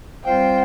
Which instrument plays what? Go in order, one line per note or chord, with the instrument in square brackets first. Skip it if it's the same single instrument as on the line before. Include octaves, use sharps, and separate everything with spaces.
[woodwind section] G3 C4 F4 C5 F5 [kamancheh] G5